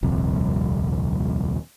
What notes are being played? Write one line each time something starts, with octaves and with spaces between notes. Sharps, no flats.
D#1 C2 F2